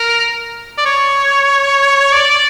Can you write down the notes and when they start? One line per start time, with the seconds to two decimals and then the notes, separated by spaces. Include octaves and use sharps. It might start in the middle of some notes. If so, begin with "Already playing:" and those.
Already playing: A#4
0.78 D5
0.86 C#5
2.12 D5